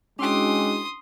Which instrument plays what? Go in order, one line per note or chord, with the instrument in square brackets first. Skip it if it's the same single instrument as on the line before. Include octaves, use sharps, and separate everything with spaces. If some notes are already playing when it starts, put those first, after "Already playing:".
[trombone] G#3 [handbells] C#4 G5 [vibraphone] D4 E4 F#4 [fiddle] C6 D#6